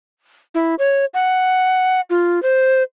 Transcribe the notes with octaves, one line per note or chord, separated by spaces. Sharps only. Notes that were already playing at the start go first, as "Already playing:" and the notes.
E4
C#5
F#5
F4
C5